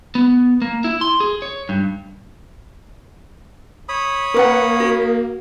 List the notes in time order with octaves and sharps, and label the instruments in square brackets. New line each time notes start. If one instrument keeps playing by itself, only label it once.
[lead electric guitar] B3
A#3
E4
C6
G#4
C#5
G2
[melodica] C#5 B5 D#6
[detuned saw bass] A#3 [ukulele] A#4 B4 F#5
[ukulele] F#4